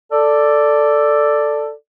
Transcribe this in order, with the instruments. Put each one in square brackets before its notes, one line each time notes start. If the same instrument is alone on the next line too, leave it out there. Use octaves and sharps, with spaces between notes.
[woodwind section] A4 D5